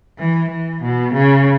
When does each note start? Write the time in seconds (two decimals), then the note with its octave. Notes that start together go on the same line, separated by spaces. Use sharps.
0.19 E3
0.49 E3
0.82 B2
1.14 C#3